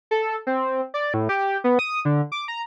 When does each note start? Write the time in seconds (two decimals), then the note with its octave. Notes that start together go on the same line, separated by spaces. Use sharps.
0.11 A4
0.47 C4
0.94 D5
1.14 A2
1.29 G4
1.64 B3
1.79 D#6
2.05 D3
2.32 D6
2.48 A#5